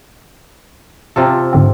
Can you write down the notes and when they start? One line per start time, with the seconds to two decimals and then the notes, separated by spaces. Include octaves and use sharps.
1.16 C3 F4 A4
1.53 G#2 D3 C4